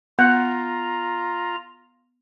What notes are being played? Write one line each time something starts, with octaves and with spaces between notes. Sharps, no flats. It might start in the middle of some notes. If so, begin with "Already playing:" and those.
B3 F4 F#5 A#5